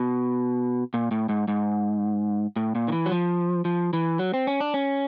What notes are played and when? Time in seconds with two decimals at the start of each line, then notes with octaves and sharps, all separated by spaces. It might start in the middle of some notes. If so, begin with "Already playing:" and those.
Already playing: B2
0.94 A#2
1.11 A2
1.29 G#2
1.48 G#2
2.56 A2
2.75 A#2
2.88 D#3
2.92 E3
3.06 F#3
3.12 F3
3.65 F3
3.93 E3
4.19 F#3
4.34 C4
4.47 C#4
4.61 D4
4.74 C#4